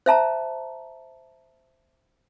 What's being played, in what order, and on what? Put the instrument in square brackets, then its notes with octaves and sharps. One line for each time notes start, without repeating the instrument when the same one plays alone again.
[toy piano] C5 E5 A5 A#5